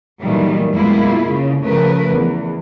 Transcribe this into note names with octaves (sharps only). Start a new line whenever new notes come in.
A#2 D#3 E3 F#3 G3 A3
F#2 B2 G#3 A#3 E4 F4
C#3
C#3 F3 A3 A#4 B4
E2